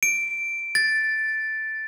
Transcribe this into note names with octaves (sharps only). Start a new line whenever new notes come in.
D7
A6